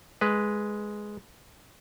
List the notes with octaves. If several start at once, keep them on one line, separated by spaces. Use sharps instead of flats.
G#3 B4